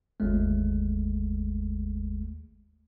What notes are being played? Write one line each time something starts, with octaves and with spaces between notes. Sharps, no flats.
G1 D#2 G#3 A3